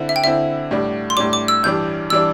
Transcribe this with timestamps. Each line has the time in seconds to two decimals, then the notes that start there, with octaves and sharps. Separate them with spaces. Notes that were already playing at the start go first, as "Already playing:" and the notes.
Already playing: D3 C4 E4
0.09 E5
0.16 G5
0.24 D3 C4 E4 E5
0.71 A2 G3 D4
1.10 C6
1.17 A2 G3 D4 D6
1.33 D6
1.48 E6
1.63 G2 E3 G3 D4 G6
2.10 E3 G3 D4 E6